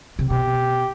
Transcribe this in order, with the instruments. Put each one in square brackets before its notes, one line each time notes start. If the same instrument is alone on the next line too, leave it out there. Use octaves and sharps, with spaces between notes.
[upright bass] C3
[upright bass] B2 [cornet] G4